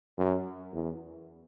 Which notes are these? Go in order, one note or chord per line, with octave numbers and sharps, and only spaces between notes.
F#2
E2